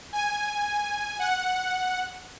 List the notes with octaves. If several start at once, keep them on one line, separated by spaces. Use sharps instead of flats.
G#5
F#5